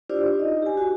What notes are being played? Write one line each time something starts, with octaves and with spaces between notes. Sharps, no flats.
D4 E4 F4 G4 C5 D5
D#4 D#5
G4 G#5
F#4